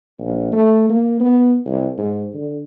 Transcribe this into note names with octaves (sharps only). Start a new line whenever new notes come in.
A#1
A3
A#3
B3
C2
G#2
D3